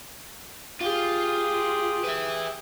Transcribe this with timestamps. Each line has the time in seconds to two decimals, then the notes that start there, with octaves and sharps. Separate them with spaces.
0.81 F4 G4 G#4
2.04 B4 E5